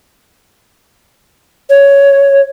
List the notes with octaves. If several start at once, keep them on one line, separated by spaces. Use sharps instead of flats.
C#5